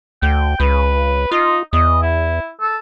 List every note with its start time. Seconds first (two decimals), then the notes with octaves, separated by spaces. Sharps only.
0.22 D2 G5
0.60 C#2 B4
1.32 D#4 F4
1.73 E2 D#5
2.02 E4
2.61 A4